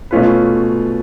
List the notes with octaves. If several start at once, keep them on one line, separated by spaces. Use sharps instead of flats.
B2 A3 C#4 F4 B4